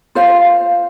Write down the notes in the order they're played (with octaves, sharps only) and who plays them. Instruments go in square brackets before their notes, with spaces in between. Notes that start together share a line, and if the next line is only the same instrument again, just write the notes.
[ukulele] F4 C5 F5